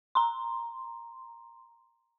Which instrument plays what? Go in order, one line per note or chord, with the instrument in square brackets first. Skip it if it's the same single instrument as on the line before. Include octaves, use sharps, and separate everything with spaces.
[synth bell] A#5 C6